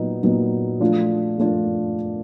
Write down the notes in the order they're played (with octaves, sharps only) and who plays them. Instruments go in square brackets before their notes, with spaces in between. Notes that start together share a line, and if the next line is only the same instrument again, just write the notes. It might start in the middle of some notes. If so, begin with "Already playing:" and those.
Already playing: [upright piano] A#2 F#3 B3 D#4
A#2 F#3 B3 D#4
F3 A3 D4 F4
F3 A3 D4 F4